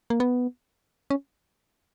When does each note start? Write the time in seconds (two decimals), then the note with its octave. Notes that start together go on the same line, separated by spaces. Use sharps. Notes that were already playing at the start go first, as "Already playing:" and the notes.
0.10 A#3
0.20 B3
1.10 C#4